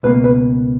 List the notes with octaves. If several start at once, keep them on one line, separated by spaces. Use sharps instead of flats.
C#2 B2 A#3 B4
B4